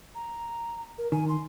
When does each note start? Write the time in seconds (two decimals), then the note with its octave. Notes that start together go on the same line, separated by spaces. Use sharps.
0.15 A#5
0.98 A#4
1.12 D#3 G#5
1.28 C6